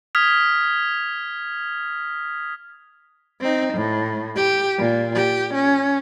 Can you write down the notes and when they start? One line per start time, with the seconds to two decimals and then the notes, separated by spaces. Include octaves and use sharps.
0.15 D#6 F6 G#6 B6
3.40 C4 D#4
3.74 A2
4.36 G4
4.78 A#2
5.15 G4
5.54 C#4